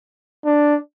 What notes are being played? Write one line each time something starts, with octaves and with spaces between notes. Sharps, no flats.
D4